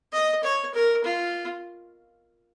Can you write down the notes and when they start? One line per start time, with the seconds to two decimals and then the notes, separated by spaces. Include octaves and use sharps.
0.12 D#5
0.43 C#5
0.74 A#4
1.04 F4